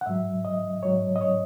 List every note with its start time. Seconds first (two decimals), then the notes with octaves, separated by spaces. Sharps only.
0.01 F#5
0.06 G#2 F#3 E5
0.45 D#5
0.83 G#2 F#3 C#5
1.16 D#5
1.21 C#5